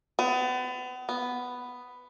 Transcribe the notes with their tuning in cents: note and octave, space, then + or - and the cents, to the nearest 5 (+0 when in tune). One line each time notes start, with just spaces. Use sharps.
B3 +35
B3 +5